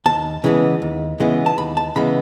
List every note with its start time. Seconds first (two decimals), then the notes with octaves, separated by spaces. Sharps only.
0.06 D#2 A5
0.44 C#3 E3 G#3 B3
0.82 D#2
1.20 C#3 E3 G#3 B3
1.46 A5
1.58 D#2 B5
1.77 A5
1.96 C#3 E3 G#3 B3 B5